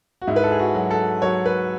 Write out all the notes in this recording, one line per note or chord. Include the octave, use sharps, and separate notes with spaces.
F#4
G#2 E4
B4
A4
G#4
F#4
F#3
A4
F#3 C#5
B4